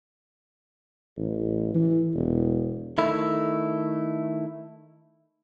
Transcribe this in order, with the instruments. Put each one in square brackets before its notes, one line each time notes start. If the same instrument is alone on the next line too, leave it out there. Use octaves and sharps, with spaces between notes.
[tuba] A1
E3
E1
[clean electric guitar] D#3 A3 E4